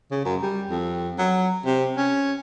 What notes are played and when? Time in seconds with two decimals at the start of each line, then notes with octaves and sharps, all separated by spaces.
0.11 C#3
0.25 F#2
0.42 G3
0.70 F2
1.19 F#3
1.65 C3
1.97 C#4